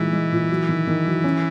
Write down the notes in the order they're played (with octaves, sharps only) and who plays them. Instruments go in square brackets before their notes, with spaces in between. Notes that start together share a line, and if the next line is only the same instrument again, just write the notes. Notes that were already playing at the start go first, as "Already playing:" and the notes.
Already playing: [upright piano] A#2 G#3 D#4 [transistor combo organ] E3
[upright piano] G#3
A#2
F#3
D#3
D#3
F#3
C#4